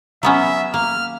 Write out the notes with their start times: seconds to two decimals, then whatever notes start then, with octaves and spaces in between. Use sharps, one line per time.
0.23 F#3 B3 C#4 E5
0.74 A#3 F6